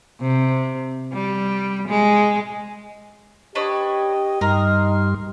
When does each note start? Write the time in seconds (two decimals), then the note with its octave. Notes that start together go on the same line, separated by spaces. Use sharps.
0.21 C3
1.13 G3
1.88 G#3
3.55 D4 G4 B4 C#5 D#5
4.41 G2 G3 D#4 A#4 C6